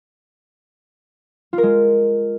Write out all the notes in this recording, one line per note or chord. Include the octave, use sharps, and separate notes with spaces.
F4
A#4
G#3